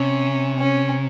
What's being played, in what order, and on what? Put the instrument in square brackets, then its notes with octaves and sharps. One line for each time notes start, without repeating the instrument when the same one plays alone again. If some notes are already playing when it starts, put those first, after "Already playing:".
Already playing: [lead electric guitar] C3 [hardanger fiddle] C#4
[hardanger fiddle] C#4